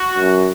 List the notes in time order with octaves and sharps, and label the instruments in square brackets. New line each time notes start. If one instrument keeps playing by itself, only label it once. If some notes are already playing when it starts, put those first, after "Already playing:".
Already playing: [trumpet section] F#4
[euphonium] F#2